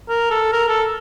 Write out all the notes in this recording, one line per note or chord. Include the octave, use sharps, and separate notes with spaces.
A#4
A4
A#4
A4